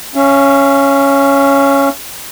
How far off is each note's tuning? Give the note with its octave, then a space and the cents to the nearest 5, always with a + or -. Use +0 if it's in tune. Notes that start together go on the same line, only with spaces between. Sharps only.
C#4 +0 F5 -45